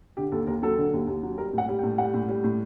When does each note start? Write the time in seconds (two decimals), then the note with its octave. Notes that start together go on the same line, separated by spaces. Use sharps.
0.17 D3 G4
0.32 D#2 A4
0.47 D#2 A#4
0.63 F#3 A4
0.78 D3
0.93 D#2
1.07 D#2
1.23 F#3
1.38 G3 A#4
1.53 A2
1.58 F#5
1.68 G3
1.79 G5
1.83 A2
1.98 G3 F#5
2.14 A2
2.29 G3
2.44 A2